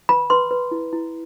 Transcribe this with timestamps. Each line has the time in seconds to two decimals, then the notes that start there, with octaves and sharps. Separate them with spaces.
0.09 B4 B5
0.30 B4 C6
0.51 B4
0.71 E4
0.93 E4